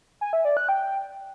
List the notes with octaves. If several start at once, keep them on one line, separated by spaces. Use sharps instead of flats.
G#5
E5
D5
F#6
G5